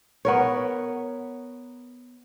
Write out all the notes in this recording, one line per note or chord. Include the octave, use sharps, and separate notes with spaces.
B3 A#4 C#5